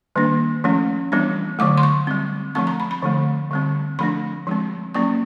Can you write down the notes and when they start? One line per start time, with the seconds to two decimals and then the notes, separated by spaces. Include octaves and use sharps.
0.16 D#3 G3 A#3 D4
0.64 F3 A3 C#4
1.12 E3 G3 B3 D4
1.59 D3 F#3 A3 D6
1.78 C6
1.83 C#6
2.07 G3 C4
2.55 F3 A3 C4 C#6
2.67 A#5
2.80 B5
2.91 B5
3.02 D3 F3 A3
3.51 D3 G3 C4
3.99 F3 A3 D4 B5
4.47 F3 G#3 C4
4.94 F#3 A#3 C#4 C#6